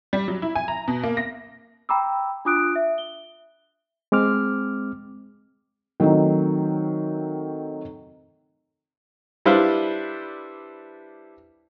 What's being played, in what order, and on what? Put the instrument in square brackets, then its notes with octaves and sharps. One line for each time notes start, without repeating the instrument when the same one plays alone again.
[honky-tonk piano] G3
F#3
E4
G#5
A#5
B2
A#3
A#6
[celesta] G5 A#5 B5 D6 E6
D4 F4 D6 D#6 F#6 D7
E5
G7
[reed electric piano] G#3 C4 D6 F6
[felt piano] D#3 F#3 A3 C4 D#4
[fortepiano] G3 D4 E4 B4 C5 F5